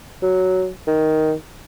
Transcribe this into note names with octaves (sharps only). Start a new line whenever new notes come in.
F#3
D#3